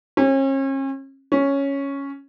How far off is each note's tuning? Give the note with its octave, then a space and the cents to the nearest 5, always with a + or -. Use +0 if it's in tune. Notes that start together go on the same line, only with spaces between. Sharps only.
C#4 -40
C#4 +0